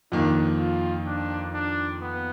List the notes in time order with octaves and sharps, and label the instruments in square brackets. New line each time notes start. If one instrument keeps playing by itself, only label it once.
[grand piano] F2 D#3 A#3 [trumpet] D4
[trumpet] F4
D4
D4
B3